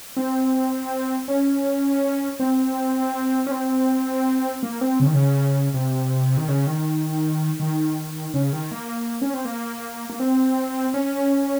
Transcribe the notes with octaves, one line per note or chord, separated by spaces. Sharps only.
C4
C#4
C4
C#4
C4
A#3
C4
C#3
D#3
C#3
C3
D#3
C#3
D#3
D#3
C#3
D#3
A#3
C#4
C4
A#3
A#3
C4
C#4